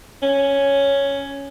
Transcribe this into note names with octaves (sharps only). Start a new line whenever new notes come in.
C#4